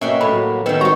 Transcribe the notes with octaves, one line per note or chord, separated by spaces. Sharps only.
B2 A#3 C#4 F#4 E5 G5
A2 B5
F#3 A#3
F#2 D#3 B3 B4 G5 E6
G3 C4 D#4 F#4 A#5 C#6